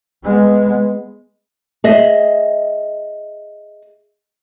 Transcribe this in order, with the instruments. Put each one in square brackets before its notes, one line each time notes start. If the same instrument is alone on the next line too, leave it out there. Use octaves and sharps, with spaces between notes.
[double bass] G#3 B3
[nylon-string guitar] G#4 D#5 E5